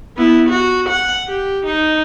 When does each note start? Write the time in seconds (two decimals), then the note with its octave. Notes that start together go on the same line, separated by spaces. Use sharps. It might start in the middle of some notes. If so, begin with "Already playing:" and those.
0.17 B3 E4
0.49 F#4
0.89 F#5
1.28 G4
1.66 D#4